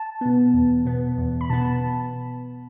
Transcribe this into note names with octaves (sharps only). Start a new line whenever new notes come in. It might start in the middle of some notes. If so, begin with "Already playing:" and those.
Already playing: A5
B2 B3
E2
B2 B3
E2
B5
B2 B3 A5